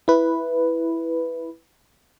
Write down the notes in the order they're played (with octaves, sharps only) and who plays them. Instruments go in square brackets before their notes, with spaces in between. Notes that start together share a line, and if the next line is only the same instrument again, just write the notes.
[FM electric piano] E4 B4